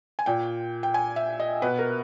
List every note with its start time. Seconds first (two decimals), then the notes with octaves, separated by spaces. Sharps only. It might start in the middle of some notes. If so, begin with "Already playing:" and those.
0.19 G#5
0.26 A#2 G5
0.83 G5
0.94 G#5
1.16 E5
1.40 D#5
1.62 B2 B4
1.79 A#4